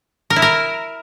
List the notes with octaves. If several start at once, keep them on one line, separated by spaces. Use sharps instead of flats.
A#4
E4
A#4